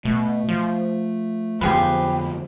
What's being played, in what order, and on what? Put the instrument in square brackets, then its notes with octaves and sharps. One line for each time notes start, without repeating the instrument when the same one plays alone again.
[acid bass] B2 [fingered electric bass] A3
[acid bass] F3
[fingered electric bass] F2 D3 B3 [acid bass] F3 [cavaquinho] G4 G#4 B4